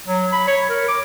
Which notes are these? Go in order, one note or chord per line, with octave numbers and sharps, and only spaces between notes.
F#3
B5
C#5
A#4
D6